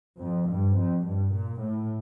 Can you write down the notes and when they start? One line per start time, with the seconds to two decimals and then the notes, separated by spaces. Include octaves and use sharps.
0.20 F2
0.49 G2
0.77 F2
1.05 G2
1.33 A#2
1.61 A2